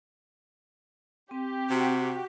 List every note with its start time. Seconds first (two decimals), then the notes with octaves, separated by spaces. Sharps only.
1.31 C4 G4
1.70 C3 F#4